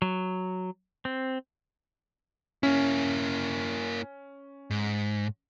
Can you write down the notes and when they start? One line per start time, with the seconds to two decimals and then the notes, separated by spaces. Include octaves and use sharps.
0.02 F#3
1.05 C4
2.63 A#3 C#4 E4
4.70 G#2